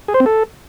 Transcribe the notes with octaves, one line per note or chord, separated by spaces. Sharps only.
G#4
C5
C4
A4